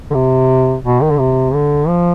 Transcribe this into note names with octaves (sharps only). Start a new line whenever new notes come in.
D3
C3
B2
D#3
D3
C3
D3
F3